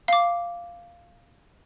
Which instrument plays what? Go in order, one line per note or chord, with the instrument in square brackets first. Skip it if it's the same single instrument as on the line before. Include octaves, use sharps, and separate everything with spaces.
[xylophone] F5 D6